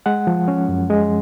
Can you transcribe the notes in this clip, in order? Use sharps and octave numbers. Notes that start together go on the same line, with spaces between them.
G#3 F#5
F3
C#4
F#2
G#3